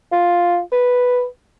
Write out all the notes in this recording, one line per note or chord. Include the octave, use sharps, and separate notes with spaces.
F4
B4